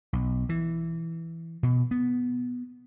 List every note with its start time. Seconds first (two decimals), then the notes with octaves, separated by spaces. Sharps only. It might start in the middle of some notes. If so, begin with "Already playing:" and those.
0.13 B1
0.49 E3
1.63 B2
1.91 B3